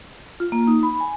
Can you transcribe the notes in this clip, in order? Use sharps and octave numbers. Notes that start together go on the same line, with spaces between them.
F4
A#3
D#4
B5
G#5